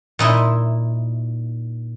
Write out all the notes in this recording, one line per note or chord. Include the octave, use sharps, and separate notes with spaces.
A#2 D#4 E4